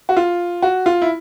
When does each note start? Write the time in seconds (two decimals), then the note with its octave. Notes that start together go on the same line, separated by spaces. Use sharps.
0.09 F#4
0.17 F4
0.62 F#4
0.86 F4
1.02 E4